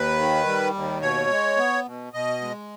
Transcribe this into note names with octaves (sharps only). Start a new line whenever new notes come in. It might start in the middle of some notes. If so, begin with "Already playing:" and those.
Already playing: D#2 B4
D#3
G3
D#2
B2 C#5
G#3
B3
B2
B2 D#5
G#3